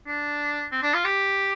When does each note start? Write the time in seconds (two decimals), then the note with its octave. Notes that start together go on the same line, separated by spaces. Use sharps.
0.07 D4
0.72 C4
0.83 D4
0.94 F4
1.05 G4